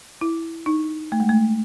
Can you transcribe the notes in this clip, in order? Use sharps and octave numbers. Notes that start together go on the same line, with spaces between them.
E4
D#4
A3
G#3
A3